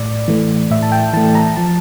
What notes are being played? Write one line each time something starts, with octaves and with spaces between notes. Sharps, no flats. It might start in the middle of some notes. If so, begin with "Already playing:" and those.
Already playing: A2 D5
E3 A3
A2 E5
A5
G5
E3 A3 A5
A#5
F3 A5